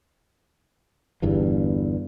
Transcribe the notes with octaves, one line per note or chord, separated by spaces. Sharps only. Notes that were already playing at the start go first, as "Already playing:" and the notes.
G1 E2 G2